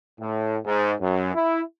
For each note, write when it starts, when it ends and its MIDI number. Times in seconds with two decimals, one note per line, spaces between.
0.19 0.57 45
0.65 0.93 44
1.00 1.34 42
1.34 1.61 64